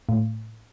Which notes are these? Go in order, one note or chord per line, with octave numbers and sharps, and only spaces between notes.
A2